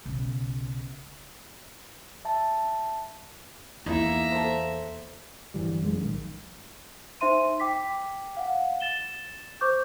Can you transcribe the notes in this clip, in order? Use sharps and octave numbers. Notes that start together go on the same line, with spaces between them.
B1 C#3
E5 A5
E2 A#3 D#4 E4 E5 A#5
A4 C5
G1 E3 G3
F#2 G3 G#3
A#1 D#3
D#4 C5 E5 C6 D#7
G5 D6 B6
F5 F#5
A6 E7 G7
C5 C#6 D6 G6